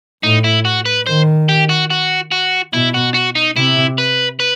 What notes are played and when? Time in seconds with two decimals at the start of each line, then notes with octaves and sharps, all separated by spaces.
0.23 A2 D#4
0.44 E4
0.65 F#4
0.86 B4
1.07 D#3 C5
1.49 G4
1.69 F#4
1.90 F#4
2.32 F#4
2.73 B2 E4
2.94 F#4
3.14 F#4
3.35 D#4
3.56 C3 E4
3.98 B4
4.40 B4